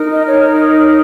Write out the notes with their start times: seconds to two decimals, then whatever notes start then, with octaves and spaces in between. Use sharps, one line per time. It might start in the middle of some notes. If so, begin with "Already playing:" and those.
Already playing: D#4 A#4
0.11 D#5
0.28 C#5